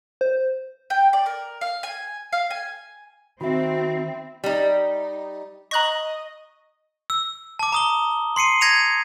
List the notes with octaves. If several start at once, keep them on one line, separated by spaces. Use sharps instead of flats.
C5
G5
D5
A#4
F5
G#5
F5
G#5
D#3 C4 F#4 E5 B5
G3 D#4
D#5 A#5 C#6 F#6 A#6 F#7
E6
A5 D6
A#5 D#6 G7
C6 C7 C#7 D#7
G#6 A#6 C#7 D#7 F7